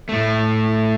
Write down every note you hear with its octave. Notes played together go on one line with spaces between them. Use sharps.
A2 A3